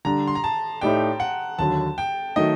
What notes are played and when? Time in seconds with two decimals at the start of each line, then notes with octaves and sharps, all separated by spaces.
0.05 D3 G3 D4 A#5
0.27 C6
0.35 A#5
0.44 A5
0.81 A2 A3 D#4 G4 D5 G5
1.20 F#5
1.58 D#2 D3 F#3 A5
1.98 G5
2.36 D#3 F#3 A3 D#4 D#5